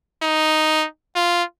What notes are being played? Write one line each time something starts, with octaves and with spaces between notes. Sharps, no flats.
D#4
F4